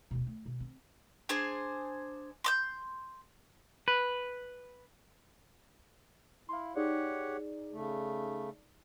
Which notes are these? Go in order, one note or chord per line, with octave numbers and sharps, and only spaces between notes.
D1 B2
A3
B2
C4
D4 G#4 C5 G#5
C6 D6 G6
B4
E4 F5 C6
D#4 G4 G#4 C#5 D5 F#5
C#3 A3